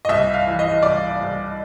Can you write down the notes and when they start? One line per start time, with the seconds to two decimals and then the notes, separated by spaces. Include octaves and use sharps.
0.05 D#5
0.08 C2 E5
0.34 F5
0.47 E3
0.59 D#5
0.83 C2 D5
1.21 C2